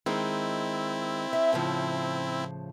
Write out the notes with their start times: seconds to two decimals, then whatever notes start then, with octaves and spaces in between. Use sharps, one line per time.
0.06 D#3 G#3 C4 E4
1.33 E5
1.53 A2 C#3 F3